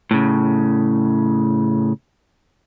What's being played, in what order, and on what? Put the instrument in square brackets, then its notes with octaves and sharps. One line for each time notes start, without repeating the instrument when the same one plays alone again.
[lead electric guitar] A2 C#3